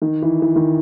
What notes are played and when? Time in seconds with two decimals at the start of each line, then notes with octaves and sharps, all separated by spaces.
0.02 D#3
0.22 E3
0.42 E3
0.56 D#3